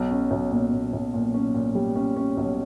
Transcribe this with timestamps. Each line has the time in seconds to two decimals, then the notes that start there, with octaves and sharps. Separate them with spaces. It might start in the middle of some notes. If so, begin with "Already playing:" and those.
Already playing: B1
0.11 C#4
0.31 B1
0.51 A#2
0.73 A#2
0.93 B1
1.14 A#2
1.34 C#4
1.55 A#2
1.75 G3
1.96 C#4
2.16 C#4
2.37 B1